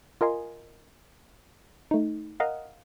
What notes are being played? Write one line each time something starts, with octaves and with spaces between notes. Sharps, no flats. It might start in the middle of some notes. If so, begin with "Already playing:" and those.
F4 A#4 D#5 G#5 C6
A3 D#4
A#4 D#5 F5 F#5